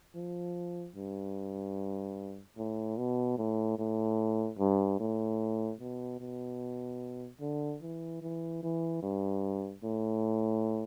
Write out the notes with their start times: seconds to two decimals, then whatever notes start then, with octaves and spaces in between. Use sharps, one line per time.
0.15 F3
0.96 G2
2.58 A2
2.97 B2
3.38 A2
3.79 A2
4.59 G2
5.00 A2
5.80 B2
6.21 B2
7.41 D3
7.82 E3
8.22 E3
8.63 E3
9.03 G2
9.83 A2